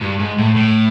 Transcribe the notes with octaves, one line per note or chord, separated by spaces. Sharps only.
G2
G#2
A2
A2